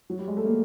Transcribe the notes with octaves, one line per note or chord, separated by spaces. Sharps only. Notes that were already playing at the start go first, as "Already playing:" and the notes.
F#3
G3
G#3
A3
A#3